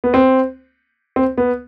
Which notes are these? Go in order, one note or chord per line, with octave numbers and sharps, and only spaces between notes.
B3
C4
C4
B3